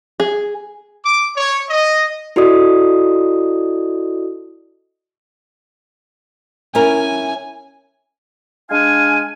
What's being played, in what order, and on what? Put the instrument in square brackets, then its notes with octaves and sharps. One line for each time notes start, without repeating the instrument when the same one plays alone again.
[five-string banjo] G#4
[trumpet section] D6
C#5
D#5
[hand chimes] E4 F#4 A4 D5 D#5 D#6
[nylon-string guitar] C#4 E4 A#4 [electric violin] G#5
[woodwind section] G#3 D4 F5 G#5